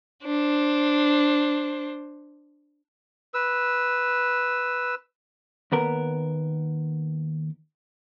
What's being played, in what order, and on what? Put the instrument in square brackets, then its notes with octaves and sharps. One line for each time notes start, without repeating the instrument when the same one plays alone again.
[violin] D4 C5
[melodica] B4 E6
[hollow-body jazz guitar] D#2 B3 A#4